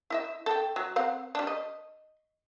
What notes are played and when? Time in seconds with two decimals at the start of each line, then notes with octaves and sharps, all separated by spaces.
0.10 E4 D#5 E5
0.46 A4 G5
0.76 F#3
0.96 C4 F5 F#5
1.35 G3 D4
1.47 D#5